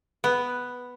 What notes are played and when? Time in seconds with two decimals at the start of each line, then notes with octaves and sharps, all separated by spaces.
0.24 B3